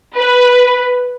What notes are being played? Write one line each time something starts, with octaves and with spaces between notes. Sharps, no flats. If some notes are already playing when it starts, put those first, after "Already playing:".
B4